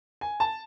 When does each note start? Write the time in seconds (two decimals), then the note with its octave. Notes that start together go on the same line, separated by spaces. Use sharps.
0.21 G#5
0.40 A5